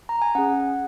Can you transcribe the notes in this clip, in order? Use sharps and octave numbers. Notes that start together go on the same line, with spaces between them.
A#5
G#5
C#4 G#4 F#5